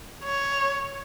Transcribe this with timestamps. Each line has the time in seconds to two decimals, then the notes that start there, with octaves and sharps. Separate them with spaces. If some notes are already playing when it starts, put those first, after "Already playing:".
0.24 C#5